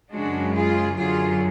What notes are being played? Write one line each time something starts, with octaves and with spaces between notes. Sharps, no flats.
F#2 C#3 G#3 D4 F#4
F4 G#4
F#2 D3 F#3 F4 G#4